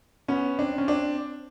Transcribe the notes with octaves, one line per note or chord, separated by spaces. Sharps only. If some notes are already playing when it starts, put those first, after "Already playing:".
B3 C#4
C4 D4
C#4
C4 D4